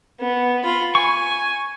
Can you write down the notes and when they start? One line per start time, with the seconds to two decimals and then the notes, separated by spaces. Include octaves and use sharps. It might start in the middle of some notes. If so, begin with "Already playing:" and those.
0.21 B3
0.64 F4 B5
0.95 G#5 C#6